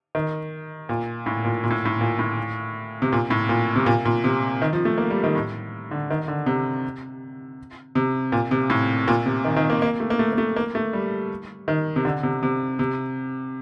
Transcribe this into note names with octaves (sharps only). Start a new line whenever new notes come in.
D#3
A#2
A2
A#2
A#2
A2
A2
A#2
A2
C3
A#2
A2
A#2
C3
A#2
A#2
C3
D#3
F3
A3
A#3
G3
D#3
A2
D3
D#3
D3
C3
C3
A#2
C3
A2
A#2
C3
D#3
D#3
A#3
A#3
A3
A#3
A3
A#3
A3
A#3
A3
G3
D#3
C3
D3
C3
C3
C3